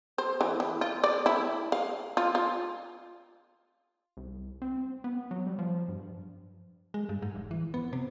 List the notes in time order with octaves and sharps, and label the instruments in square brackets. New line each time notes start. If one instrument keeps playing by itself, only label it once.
[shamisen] C5
E3
E3
F4
D5
E4
F5
F4
F4
[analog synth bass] C2
C4
B3
F#3
G3
F3
G2
[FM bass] G#3
G2
G#2
F1
E3
B3
C3